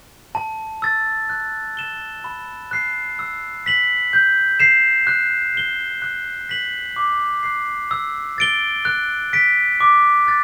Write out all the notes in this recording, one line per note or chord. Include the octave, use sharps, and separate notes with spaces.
A5
E6 A6
F#6
A6 E7 G7
B5
F#6 C7
E6
B6 F#7
G6
C7 E7
F#6
C7 G7
F#6
B6 F#7
D6
F#6 C7
E6
A6 D7 G7
F#6
B6 D7
D6
F#6 A6